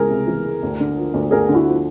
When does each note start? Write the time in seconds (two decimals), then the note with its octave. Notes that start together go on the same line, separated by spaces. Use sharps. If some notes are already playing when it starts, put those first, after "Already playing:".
Already playing: C#2 E3 G#3 G#4 A#4
0.10 C3
0.27 E3
0.45 G#3
0.63 D2
0.80 D3
0.97 F3
1.14 D2
1.31 D2 G#4 A#4
1.49 D3
1.54 E4 F#4
1.66 F3